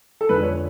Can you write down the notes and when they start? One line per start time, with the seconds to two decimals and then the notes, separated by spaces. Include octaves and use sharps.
0.21 A4
0.29 F2 D3 F3 G#3 B4
0.43 C#5